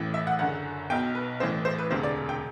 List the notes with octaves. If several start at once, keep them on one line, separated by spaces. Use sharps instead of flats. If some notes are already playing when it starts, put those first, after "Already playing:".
Already playing: A1 A2 E3
E5
F#5
F#1 F#2 D3 F#5
B1 B2 G5
B4
A1 A2 E3 C5
C5
B4
E1 D2 C3 C5
D5
G5